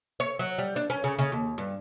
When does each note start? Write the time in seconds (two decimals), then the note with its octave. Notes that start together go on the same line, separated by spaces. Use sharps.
0.20 C#5
0.39 F#3
0.58 G3
0.76 D4
0.90 C#4
1.04 C#3
1.19 C#3
1.32 D#2
1.58 G2